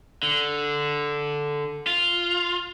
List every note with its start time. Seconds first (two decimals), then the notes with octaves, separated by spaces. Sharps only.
0.23 D3
1.87 F4